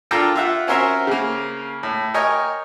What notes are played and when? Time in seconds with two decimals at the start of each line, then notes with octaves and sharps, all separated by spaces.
0.11 D4 F4 A4 A#4 G5 A#5
0.35 F4 E5 F#5
0.67 C4 C#4 F#4 A#4 C5 E5
1.07 C#3 A#3
1.83 A2
2.14 A#4 C#5 D#5 G5 G#5